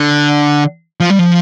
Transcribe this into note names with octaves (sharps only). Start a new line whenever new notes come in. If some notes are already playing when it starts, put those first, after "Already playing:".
Already playing: D3
F3
G3
F3